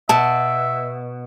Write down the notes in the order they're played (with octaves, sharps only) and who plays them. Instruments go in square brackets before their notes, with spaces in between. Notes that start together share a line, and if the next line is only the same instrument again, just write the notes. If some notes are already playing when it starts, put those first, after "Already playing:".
[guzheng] B2 [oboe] E5 [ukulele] A5